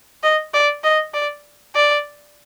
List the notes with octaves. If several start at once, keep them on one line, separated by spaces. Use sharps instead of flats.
D#5
D5
D#5
D5
D5